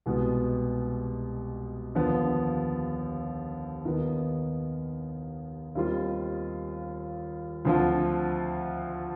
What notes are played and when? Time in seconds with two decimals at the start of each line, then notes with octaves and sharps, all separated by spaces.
0.06 C2 B2 G#3 B3
1.95 D#2 D3 F3 B3
3.85 D#2 D#3 B3
5.75 D#2 D#3 G3 C4 F4
7.65 D2 D3 F3 C4 F4